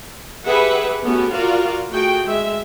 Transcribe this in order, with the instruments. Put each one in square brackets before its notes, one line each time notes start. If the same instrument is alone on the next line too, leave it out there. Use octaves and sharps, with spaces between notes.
[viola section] G4 G#4 B4 E5 F#5
A3 B3 C#4 F#4 G4
F4 F#4 A#4 D5 F5
A3 F#4 G#4 G5
G#3 E5